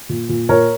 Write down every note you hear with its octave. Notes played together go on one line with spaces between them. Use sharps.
A#2
A#2
A#2 A#4 C#5